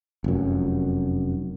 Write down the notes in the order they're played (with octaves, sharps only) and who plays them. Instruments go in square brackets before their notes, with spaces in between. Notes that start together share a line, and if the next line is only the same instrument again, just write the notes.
[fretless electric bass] F1 F#2